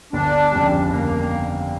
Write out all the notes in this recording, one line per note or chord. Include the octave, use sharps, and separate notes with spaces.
G1 D4
F2 C#3 G3
G1 A#3